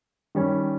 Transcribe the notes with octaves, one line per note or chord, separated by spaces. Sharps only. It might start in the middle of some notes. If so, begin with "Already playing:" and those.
D#3 G3 C#4